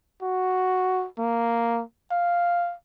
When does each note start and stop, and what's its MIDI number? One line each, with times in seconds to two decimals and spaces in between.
0.22 1.06 66
1.19 1.82 58
2.12 2.74 77